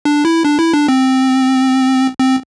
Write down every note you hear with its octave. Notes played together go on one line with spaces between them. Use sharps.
D4
E4
D4
E4
D4
C4
C4